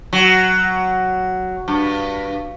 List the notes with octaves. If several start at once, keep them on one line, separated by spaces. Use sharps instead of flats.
F#3
G2